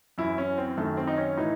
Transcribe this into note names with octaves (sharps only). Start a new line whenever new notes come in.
F#2 E3 E4
C#4
C4
F#2 D#3 A3
C4
D#4
C#4
A2 E3 D#4